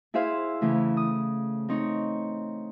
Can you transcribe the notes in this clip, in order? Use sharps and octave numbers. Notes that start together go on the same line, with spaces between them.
E4 G#4 C5 E5 F5
C#3 E3 A3
D#6
C4 D#4 C#5